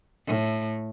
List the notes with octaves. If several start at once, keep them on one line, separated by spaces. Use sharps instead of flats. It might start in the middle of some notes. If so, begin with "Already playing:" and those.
A2